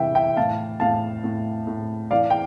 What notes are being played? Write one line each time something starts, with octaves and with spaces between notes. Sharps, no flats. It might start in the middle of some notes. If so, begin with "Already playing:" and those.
Already playing: C3 E3 G3 E5 G5
E5 G5
A2 F5 A5
A2 F5 A5
A2
A2
E3 D5 F5
G5